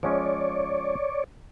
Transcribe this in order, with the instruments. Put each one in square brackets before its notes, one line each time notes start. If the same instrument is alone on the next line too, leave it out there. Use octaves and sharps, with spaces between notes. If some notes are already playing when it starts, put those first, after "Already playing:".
[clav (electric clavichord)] F3 G#3 C#4 [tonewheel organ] C#5 D5